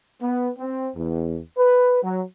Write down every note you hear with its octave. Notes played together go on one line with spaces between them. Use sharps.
B3
C4
E2
B4
F#3